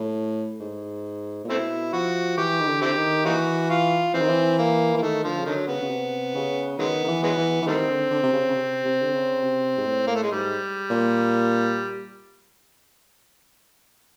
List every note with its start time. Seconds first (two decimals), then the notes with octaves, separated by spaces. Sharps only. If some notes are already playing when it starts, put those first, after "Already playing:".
Already playing: A2
0.60 G#2
1.44 A#2
1.49 B2 A3 C4 E4
1.93 F3 F#4
2.37 E3 G4
2.61 D#3
2.66 D3
2.82 C4 E4 G4
2.96 D#3
3.25 E3 A#3 D#4 F#4
3.70 F4
4.14 E3 C4
4.21 D#3
4.29 E3
4.58 A#3
4.94 E3
4.97 A#3
5.02 D#3 A3
5.24 D3 F3
5.38 C#3
5.46 D3 D#3 F#3
5.68 C#3 B3
5.82 C#3
5.90 C3
6.35 C#3
6.79 D#3 F#3 G#3 B3
7.04 D#3
7.08 E3
7.23 F#3 G#3 B3
7.37 E3
7.62 E3
7.67 D#3 G3 A3 C4
7.89 D3
8.11 D3
8.23 C3
8.33 C#3
8.49 C#3
8.55 C3
8.85 C3
9.02 D3
9.13 C#3
9.43 C3
9.77 G#2
9.87 A2
10.07 A#3
10.15 A3
10.23 G#3
10.31 G#2 G3
10.90 A#2